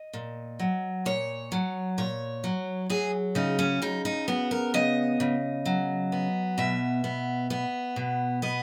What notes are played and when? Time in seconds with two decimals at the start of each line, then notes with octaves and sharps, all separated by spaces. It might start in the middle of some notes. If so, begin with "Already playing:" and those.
Already playing: D#5
0.13 A#2
0.60 F#3
1.05 A#2 C#5
1.52 F#3
1.98 A#2 C#5
2.44 F#3
2.90 F#3 G#4
3.35 C#3 D#4
3.59 C#4
3.82 C#3 D#4
4.05 D#4
4.28 B3 F#4
4.51 A#4
4.74 C#3 D#5
5.20 C#3
5.66 F#3
6.12 B3
6.58 B2 E5
7.04 B3
7.50 B3
7.96 B2
8.42 B3 D#5